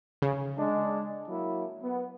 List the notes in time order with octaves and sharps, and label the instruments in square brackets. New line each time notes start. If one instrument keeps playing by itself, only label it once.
[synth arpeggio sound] C#3
[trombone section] G#3 D4
F#3 A#3 E4
B3